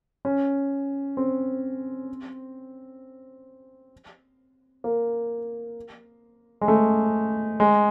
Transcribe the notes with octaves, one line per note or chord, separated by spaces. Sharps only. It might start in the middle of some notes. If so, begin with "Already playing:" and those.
C#4
C4
A#3
G#3
A3
G#3